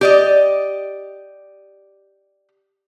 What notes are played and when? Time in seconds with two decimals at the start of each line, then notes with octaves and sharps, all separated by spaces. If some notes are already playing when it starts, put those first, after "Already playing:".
0.01 G4 D5 D#5